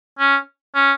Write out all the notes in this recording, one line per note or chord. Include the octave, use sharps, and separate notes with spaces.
C#4
C#4